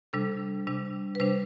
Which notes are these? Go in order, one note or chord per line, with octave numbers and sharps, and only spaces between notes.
C3 G3 D4 A4
C3 G3 D4
B4
C3 G3 D4 C5